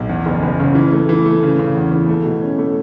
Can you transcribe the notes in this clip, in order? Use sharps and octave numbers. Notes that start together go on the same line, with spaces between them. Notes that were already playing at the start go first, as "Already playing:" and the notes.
Already playing: B1
E2
F#1
F#1
C#3
E3
A3
E3
A3
C#3
C#3
E2
E3
A3
B2
C#4
A3